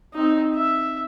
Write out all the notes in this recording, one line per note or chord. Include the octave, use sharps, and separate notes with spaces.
C4 D#4
E5